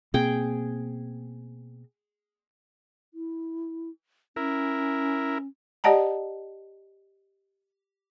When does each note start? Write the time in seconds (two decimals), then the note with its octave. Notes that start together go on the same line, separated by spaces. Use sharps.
0.14 B2 A#3 C4 G#4 G5
3.14 E4
4.36 C#4 E4 A#4
5.84 G4 D5 D#5 F#5 A5 A#5